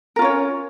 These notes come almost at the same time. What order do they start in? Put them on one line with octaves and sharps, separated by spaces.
A#4 F4 C#4 C#5